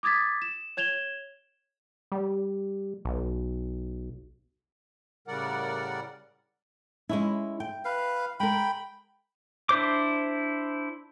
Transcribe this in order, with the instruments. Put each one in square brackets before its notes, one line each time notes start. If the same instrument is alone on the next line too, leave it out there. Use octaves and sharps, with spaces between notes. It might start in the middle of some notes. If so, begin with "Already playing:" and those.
[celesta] D6 D#6 G#6 A6 B6
E7
C#5 G#6 E7 F7 G7
[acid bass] G3
B1
[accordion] A2 C#3 G3 A#4 D5 F#5
[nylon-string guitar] G#3 C#4 E4
G5
[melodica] B4 F5
[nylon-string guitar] G#3 A#4 [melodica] G5 B5
[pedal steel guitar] D4 E4 C5 D6